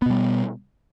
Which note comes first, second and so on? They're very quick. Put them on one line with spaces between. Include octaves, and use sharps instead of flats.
B3 B2 G3